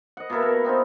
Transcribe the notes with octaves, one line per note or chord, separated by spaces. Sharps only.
D#5 F#5
B2 A#3 E4 A4
A#4
B3 C4 D#4 F4